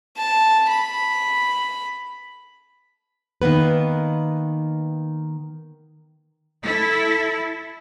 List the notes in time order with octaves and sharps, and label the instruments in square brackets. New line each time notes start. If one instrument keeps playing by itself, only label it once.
[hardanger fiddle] A5
B5
[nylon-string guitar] D#3 A#3 B3 B4
[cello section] E4 A4